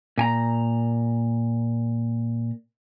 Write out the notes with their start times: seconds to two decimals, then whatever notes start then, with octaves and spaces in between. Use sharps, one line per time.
0.18 A#2 G#5 A#5